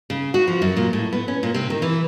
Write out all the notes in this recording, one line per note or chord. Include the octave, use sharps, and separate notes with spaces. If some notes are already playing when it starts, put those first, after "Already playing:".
C#3
F#4
F3
F#2
A#2
A2
B3
C#4
A#2
C3
D#3
E3